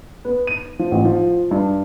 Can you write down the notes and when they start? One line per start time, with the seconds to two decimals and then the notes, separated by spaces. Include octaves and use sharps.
0.25 B3
0.47 D#7
0.79 F3
0.92 A1
1.05 F3
1.51 G2